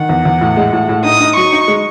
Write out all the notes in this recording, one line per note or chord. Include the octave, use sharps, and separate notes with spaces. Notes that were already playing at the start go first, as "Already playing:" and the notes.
Already playing: D#3 F#5
E2
E2
A2
G#3
A2
A2
D#4 D#6
D#4
F#3 C#6
D#4
G#3